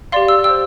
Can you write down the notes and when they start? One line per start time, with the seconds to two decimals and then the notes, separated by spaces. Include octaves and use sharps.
0.12 G4 D5 F5 C6
0.28 E6
0.44 C5 G5 E6